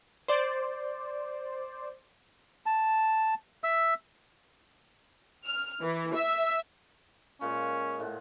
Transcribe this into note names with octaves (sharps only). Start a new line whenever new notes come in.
C5 D5
A5
E5 E6
F6
E3
E5
A#2 G#3 C#4
A2 G#3 F#5